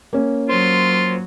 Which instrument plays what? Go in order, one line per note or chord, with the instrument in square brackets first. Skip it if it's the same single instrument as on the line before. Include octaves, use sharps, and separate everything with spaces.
[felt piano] A#3 C#4
[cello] F#3 [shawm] F4 [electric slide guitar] C5